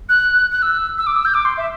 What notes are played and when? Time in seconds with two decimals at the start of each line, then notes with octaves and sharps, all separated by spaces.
0.09 F#6
0.52 F#6
0.62 E6
0.98 E6
1.07 D6
1.16 E6
1.25 G6
1.34 D6
1.45 C6
1.57 E5